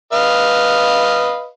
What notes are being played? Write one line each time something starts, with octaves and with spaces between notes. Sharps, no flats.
B4 D#5 F5